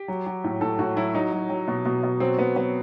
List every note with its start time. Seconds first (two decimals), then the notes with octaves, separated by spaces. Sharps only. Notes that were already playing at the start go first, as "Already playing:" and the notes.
Already playing: G4
0.08 F#3
0.26 F#3
0.44 A2
0.61 A2 A4
0.79 A2 F#4
0.96 F#3 E4
1.14 F#3 D#4
1.32 F#3
1.50 F#3
1.68 B2
1.85 B2
2.03 B2
2.20 F#3 C4
2.38 B2 B3
2.56 F#3 B3